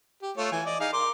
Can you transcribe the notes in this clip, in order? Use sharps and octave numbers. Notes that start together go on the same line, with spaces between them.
G4
A3 F4 C#5
E3 G#5
D5 D#5
D#4 G#4 F5
A#4 C6 D6